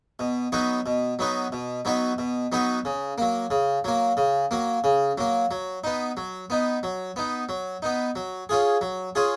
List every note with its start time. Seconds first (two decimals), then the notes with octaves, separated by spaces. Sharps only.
0.19 B2
0.52 F#3 B3 D#4 F#4
0.86 B2
1.19 F#3 B3 D#4 F#4
1.52 B2
1.85 F#3 B3 D#4 F#4
2.18 B2
2.52 F#3 B3 D#4 F#4
2.85 C#3
3.18 F#3 A#3
3.51 C#3
3.85 F#3 A#3
4.17 C#3
4.51 F#3 A#3
4.84 C#3
5.18 F#3 A#3
5.51 F#3
5.84 B3 D#4
6.17 F#3
6.50 B3 D#4
6.83 F#3
7.16 B3 D#4
7.49 F#3
7.82 B3 D#4
8.16 F#3
8.49 C#4 F4 G#4
8.81 F#3
9.15 C#4 F4 G#4